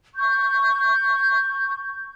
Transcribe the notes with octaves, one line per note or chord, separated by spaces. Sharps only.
C#6 G6